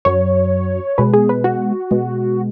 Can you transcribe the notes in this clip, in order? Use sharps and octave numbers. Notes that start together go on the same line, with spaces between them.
F#2 F#3 C#5
B2 G#3 B4
G#4
B4
F#4
B2 G#3